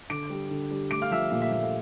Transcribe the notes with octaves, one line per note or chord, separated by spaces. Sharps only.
D3 D6 D7
G3
D3
G3
A3 D6 D7
F5 F6
F3 E5 E6
A#2 F5
E5
A#2 E5
F5